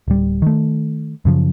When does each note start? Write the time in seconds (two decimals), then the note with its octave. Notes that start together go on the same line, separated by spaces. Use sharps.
0.08 D1 G3
0.42 D#3 A3
1.25 F#2 C#3 F3